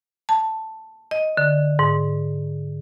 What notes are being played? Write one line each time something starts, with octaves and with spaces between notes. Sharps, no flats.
A5
D#5
D3
G#2